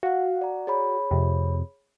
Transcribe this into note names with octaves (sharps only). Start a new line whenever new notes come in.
F#4 F5 F#5
D5 A#5
G#4 C#5 B5
F2 C3